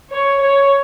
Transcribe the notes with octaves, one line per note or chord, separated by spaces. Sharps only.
C#5
C#5